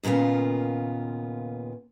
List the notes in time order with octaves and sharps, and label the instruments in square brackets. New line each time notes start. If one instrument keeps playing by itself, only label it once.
[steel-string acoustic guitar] D#2 A#2 C#3 B3 F4